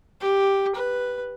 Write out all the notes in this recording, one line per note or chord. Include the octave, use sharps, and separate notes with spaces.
G4
B4